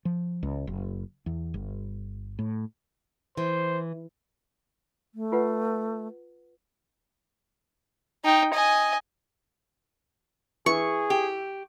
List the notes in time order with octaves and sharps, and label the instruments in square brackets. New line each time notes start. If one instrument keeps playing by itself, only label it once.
[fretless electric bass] F3
C#2
F#1
E2
G1
A2
[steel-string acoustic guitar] E3 [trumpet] C5
[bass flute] A3
[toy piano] F4 B4 F#5
[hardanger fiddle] D#4 G5
D#5 G#5
[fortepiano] E3 [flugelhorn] G#4 [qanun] C#6
[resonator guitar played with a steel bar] G4